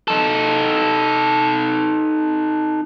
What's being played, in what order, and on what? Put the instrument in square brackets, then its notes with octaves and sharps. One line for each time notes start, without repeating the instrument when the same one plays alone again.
[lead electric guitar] D#4 A4